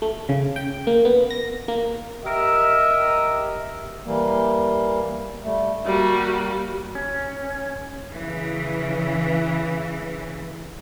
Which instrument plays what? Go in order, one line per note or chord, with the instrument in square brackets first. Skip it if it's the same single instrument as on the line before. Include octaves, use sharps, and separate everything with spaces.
[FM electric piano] A3
C#3
G5
A#3
B3
A#6
A#3
[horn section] G4 A#4 D#5 E5
[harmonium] E3 G3 A#3
G3 A3
[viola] G3 F#4 [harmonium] A#3 A#4
[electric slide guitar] C#4
[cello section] C#3 E3